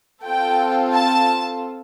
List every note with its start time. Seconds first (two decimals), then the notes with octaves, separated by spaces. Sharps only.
0.24 C4 F4 A4 G5
0.94 A5